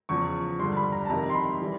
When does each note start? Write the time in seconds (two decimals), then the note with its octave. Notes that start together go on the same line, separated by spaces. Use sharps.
0.09 E2 C#3 F3 C#6
0.59 G2 D3 G3 C6
0.77 B5
0.92 A#5
1.05 A5
1.09 F2 C3 D#3 A#5
1.30 C6
1.35 B5
1.62 E3 G3